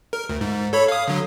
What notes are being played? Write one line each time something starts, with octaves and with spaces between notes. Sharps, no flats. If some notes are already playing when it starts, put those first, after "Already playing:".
A#4
D2
G#2
A4 C#5 B5
F5 D#6
D3 F#3